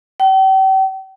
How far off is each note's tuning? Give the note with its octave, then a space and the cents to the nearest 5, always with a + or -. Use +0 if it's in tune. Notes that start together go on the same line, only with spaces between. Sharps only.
G5 -40